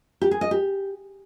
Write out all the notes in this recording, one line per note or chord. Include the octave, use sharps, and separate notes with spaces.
G4
G#4
D#5
G4